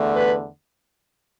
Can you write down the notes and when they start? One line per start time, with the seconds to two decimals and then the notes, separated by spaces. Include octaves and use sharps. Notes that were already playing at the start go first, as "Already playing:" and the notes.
Already playing: E2 D3 A3
0.15 B4